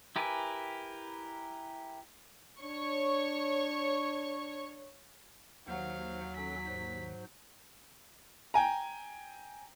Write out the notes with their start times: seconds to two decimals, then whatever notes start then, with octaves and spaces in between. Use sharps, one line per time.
0.16 E4 G4 A#4 B4 G#5
2.62 D4 C#5 C#6
5.68 D#2 F#3 C5 F5 F#5
6.36 C#4 A4 B6
6.66 G#2 C5
8.54 G5 G#5 A#5